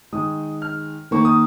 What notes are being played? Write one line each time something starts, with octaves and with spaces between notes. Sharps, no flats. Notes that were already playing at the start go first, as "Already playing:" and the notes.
D#3 G#3 D#6
F6
D#3 A#3 C#6
D#6